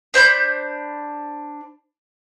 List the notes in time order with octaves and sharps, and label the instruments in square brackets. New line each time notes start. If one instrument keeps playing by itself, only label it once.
[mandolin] D4 C5 B5 G6